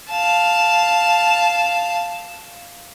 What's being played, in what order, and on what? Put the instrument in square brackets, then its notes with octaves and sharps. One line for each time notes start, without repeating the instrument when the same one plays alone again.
[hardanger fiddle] F5 A5